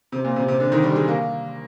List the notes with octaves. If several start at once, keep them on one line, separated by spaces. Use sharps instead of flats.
C3
A#2
C3
C3
D3
D#3
G3
G#3
A#3